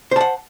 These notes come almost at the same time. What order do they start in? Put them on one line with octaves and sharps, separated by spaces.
C5 A5 F#5